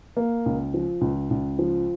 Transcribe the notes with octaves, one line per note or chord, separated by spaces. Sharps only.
A#3
C#2
F3
C#2
C#2
F3